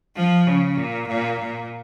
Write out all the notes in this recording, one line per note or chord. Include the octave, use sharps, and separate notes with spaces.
F3
C#3
A#2
A#2
A#2